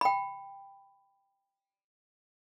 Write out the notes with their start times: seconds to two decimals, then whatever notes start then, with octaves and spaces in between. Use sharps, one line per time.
0.01 G5 B5